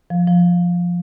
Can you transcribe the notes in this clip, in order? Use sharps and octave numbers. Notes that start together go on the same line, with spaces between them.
F3
F3